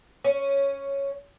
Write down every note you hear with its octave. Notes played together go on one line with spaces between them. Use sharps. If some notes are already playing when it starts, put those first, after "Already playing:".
C#4